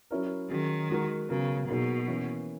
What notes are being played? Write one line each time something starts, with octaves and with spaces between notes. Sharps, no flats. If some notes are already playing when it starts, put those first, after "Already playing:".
F#3 C#4 E4 A#4
D#3 F#3 C#4 G#4
G#3 D#4 F#4 A#4
C#3 F#3 B3 F#4 A#4
B2 F#3 A#3 D#4 G#4
E3 A#3 C#4